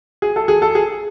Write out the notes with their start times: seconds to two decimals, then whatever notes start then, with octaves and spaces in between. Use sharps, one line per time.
0.22 G#4
0.36 A4
0.48 G#4
0.62 A4
0.75 G#4